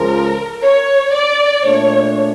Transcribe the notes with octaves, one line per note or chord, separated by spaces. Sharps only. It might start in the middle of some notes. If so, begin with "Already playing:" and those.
Already playing: C#2 C#3 F3 A#4
C#5
D5
A#2 A3 D4 C#5